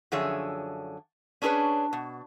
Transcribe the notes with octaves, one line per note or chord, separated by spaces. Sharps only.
F#2 D3 F3 G#4 C#5 E5
C#4 D4 G#4 A#4 B4 C#5
B2